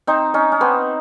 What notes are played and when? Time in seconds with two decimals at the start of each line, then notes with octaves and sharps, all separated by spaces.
0.07 C4 D#4
0.34 C#4 D#4
0.52 C#4
0.61 B3 C4